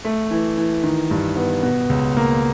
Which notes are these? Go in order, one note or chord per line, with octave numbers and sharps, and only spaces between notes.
A3
E3
E3
D#3
G2
B3
B2
C#2
A#3